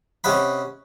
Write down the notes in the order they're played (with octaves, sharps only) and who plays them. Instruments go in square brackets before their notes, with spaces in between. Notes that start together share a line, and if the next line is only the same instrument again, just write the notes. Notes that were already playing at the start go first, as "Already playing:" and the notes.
[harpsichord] C3 C#4 D#5 F#5 B5